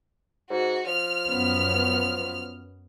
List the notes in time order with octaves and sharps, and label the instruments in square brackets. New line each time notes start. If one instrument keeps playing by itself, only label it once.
[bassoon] G#2 [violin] F#4
[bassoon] F3 [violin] F6
[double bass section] F#2 B3 C#4